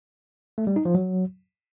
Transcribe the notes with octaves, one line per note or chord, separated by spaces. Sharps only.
A3
G3
D#4
F3
F#3